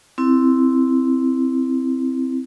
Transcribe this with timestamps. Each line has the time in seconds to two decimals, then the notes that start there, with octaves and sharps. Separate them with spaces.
0.18 C4 E4